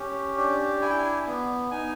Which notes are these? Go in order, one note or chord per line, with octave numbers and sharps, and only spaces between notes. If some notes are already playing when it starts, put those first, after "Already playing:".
Already playing: C#4 G4
D4
E4 G#5
G5
G#5
B3
D#4 G#5